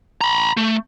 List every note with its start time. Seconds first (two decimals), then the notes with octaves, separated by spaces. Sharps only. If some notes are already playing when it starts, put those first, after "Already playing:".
0.21 A#5 B5
0.57 A3